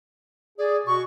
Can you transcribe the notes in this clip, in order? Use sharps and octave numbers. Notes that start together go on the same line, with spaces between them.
G#4 D5
B2 F#4 C#6